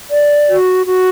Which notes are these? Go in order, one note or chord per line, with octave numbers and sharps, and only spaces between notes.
D5
F#4
F#4